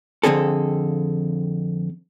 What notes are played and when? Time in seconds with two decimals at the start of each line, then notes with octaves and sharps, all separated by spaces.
0.23 F2 D3 C4 G#4 A4